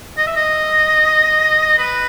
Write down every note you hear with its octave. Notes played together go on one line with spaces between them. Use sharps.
D#5
E5
D#5
B4